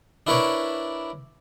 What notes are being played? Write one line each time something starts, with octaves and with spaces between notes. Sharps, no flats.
D4 E4 A#4 B4 C#5 D5